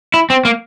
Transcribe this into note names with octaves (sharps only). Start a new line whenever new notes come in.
E4
C4
A#3